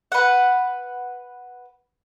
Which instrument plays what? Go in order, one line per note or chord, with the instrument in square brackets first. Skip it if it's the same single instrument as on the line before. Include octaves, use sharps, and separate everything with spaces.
[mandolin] B4 F#5